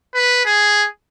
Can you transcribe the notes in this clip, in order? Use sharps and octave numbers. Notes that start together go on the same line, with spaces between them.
B4
G#4